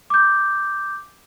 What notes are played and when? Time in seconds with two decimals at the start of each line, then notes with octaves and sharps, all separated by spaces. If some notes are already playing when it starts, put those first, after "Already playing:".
0.10 D6 G6